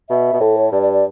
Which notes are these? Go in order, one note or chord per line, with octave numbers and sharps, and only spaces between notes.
B2 E5
B2
A2 A4
C#5
G2 D5
D5
D5